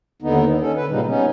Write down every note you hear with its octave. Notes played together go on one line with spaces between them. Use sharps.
D#2 D3 B3 D#4
D#3
C#4 A4
D3 B4
A#2 C#3 G3 D#4
B3 C#4 D#4